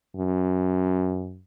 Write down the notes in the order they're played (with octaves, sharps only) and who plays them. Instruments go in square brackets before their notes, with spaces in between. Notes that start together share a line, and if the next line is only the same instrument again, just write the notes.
[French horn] F#2